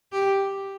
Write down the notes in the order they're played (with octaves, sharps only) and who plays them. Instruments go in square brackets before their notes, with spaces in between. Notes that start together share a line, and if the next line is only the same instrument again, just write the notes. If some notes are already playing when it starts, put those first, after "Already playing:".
[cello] G4